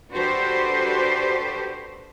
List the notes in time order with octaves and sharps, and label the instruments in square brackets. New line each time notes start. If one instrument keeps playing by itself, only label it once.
[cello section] D4 F#4 G4 A4 B4 C5